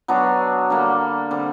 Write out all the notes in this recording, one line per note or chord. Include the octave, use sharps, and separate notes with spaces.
F#3 B3 D4 F#4
D3 G3 A#3
D3 G3 C4